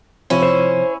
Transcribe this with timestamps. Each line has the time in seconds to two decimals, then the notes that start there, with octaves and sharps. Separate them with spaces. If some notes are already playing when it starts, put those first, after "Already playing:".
0.30 C3 F3 C4 C#4 E4
0.43 C5